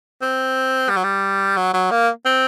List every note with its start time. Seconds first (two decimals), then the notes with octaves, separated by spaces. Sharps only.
0.21 C4
0.89 G3
0.96 F#3
1.04 G3
1.57 F#3
1.73 F#3
1.91 A#3
2.25 C4